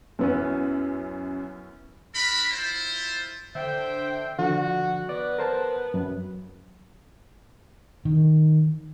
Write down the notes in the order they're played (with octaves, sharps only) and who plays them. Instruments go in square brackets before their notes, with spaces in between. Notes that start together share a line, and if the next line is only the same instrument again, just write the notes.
[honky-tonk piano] F#2 [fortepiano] E3 B3 C#4
[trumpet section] D4 A#4 B5
E4 F4 C5
[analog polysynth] D3 [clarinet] C5 [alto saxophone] E5 [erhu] G5
[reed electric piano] D3 F3 [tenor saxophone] F#4
[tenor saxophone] B3 [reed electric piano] D5
[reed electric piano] A#4 C5 A5
F#2
[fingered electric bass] D#3